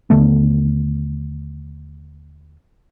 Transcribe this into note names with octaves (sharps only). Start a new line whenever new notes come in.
D#2 D3 A3 B3